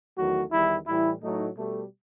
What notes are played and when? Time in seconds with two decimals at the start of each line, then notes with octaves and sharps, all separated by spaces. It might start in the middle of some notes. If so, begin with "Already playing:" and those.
0.16 E2 D#3 F#3 A3 F#4
0.50 E2 D#3 G3 E4
0.86 A2 E3 G3 E4
1.21 A2 F#3 A3 D#4
1.56 B2 G3 A3